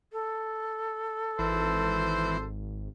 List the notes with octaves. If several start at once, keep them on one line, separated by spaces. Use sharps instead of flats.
A4
G#1 E3 C5